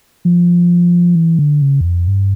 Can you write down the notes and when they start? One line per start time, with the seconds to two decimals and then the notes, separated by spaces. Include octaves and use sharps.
0.25 F3
1.15 E3
1.39 D3
1.62 C#3
1.81 E2
1.85 F2
2.07 G2